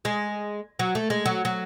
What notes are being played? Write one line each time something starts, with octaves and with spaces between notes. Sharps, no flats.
G#3
F#3
A3
G#3
F#3
F#3